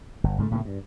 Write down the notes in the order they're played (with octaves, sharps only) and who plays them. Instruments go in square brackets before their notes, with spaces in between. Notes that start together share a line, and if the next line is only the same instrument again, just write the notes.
[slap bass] G1
G#2 C#3 F#3 A3
A2 C#3 A3 A#3
G2